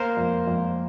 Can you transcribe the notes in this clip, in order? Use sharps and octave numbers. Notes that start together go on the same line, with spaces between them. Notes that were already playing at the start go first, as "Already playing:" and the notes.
Already playing: A#3 A#4 C5
F2
F2